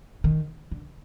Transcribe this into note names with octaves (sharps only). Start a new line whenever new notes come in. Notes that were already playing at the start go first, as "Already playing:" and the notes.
D#3
D3